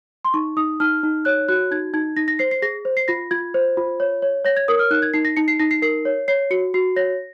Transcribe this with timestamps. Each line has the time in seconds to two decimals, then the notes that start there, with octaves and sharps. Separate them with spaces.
0.25 C6
0.34 D#4 C#6
0.57 D#4 D#6
0.80 D#4 F6
1.03 D#4
1.25 C#5 F#6
1.49 F#4 F#6
1.71 D#4 G#6
1.94 D#4 G#6
2.16 D#4 A#6
2.28 A#6
2.39 C5 C7
2.51 C7
2.62 G#4 A#6
2.85 C5
2.97 C7
3.08 F4 A#6
3.31 F4 G#6
3.54 C5
3.77 F4
4.00 C#5
4.22 C#5
4.45 C#5 A#6
4.57 G#6
4.68 A#4 D#6
4.79 F6
4.91 D#4 F#6
5.02 G#6
5.14 D#4 C7
5.25 A#6
5.37 D#4 C#7
5.48 C7
5.60 D#4 A#6
5.71 C7
5.82 A#4 C7
6.05 C#5
6.28 C#5 C7
6.51 F#4 C#7
6.74 F#4 C7
6.96 C#5 A#6